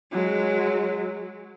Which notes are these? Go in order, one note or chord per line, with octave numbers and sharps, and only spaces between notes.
F#3 G#3